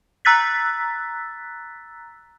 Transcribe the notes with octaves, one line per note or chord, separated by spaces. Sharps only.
A#5 E6 F#6 A6 B6